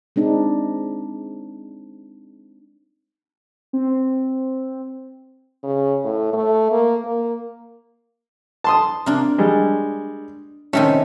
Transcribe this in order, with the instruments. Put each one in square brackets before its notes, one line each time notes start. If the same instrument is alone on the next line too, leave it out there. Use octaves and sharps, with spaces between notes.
[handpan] G#3 C4 D4 D#4
[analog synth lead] C4
[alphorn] C#3
A2
A3
A#3
A#3
[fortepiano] A5 C6 D#6
[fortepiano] C3 [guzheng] A#3 D4
[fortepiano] G3 G#3
[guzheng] C3 D#3 A3 [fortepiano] C#4